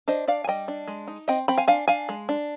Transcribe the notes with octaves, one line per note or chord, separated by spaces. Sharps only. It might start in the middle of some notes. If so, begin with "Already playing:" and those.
D4 C5 D#5
D4 D5 F5
G#5
G3 D#5 G5
D4
G#3
D#4
C4 D#5 G5
C4 G5 B5
F5 G#5
D4 F5 G#5
D4 F5 G#5
G#3
D4